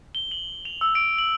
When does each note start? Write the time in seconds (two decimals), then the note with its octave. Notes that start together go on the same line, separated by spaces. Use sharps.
0.15 G7
0.31 F#7
0.65 F7
0.81 E6
0.95 D7
1.18 F#7